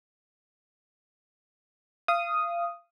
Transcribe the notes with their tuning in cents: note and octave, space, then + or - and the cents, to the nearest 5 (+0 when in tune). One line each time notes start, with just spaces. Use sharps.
F5 -25 D#6 +0